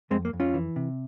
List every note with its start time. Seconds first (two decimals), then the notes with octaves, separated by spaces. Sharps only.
0.11 F2 G#3 C4
0.25 A#3
0.33 F2
0.40 C#4 F4
0.54 E3
0.76 C3